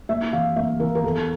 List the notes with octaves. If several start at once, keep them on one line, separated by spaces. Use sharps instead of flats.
A#3 E5
E3 F5
A#3 E5
E3 A#4
A#4
E2 A4